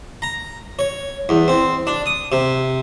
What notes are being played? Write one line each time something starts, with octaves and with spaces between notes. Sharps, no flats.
A#5
C#5
E2
C4
D4
D#6
C3